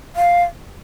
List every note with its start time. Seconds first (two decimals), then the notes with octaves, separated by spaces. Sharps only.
0.16 F5